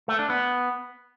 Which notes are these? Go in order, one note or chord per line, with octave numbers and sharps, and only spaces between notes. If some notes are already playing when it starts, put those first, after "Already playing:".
A3
D4
B3